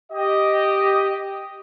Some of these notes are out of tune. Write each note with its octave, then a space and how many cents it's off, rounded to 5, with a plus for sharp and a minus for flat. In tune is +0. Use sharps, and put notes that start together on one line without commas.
G4 +0 D#5 +0